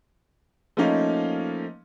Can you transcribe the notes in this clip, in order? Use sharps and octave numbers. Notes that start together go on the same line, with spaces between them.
F3 A3 A#3 C#4 D#4 F5